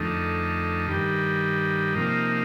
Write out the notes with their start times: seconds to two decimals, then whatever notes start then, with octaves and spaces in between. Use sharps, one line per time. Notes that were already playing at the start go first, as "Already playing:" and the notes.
Already playing: F2 D3 A3 D#4
0.87 G2 D#3 G3
1.94 C3 F3 A#3 D#4